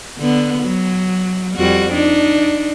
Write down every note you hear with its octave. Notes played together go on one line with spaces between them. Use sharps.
D3 B3
F#3
F2 G3 F#4
D4 D#4